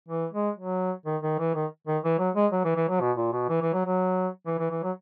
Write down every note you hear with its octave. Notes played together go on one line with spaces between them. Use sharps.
E3
G#3
F#3
D#3
D#3
E3
D#3
D#3
E3
F#3
G#3
F#3
E3
E3
F#3
B2
A#2
B2
E3
E3
F#3
F#3
E3
E3
E3
F#3